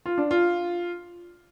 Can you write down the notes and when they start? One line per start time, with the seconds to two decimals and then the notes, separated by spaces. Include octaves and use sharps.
0.06 F4
0.18 D4
0.31 F4